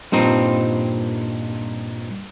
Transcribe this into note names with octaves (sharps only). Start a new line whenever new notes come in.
G2 A#2 C4 D#4